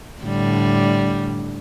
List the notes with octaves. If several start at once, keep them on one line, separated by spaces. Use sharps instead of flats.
A2 D3 G3